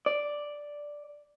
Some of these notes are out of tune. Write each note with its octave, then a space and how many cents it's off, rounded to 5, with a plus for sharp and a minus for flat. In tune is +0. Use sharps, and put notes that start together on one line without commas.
D5 +0